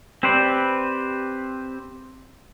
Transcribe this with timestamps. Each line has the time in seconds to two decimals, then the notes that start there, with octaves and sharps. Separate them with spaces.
0.23 C4 G4 B4 C5 D5